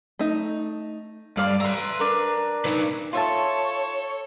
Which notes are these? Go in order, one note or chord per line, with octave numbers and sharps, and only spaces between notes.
A3 D#4
G2 D5 F5 D6
B4 E5 A#5 C6
D4 A#4
D#4 B4
F4 A4 C#5 E5 A5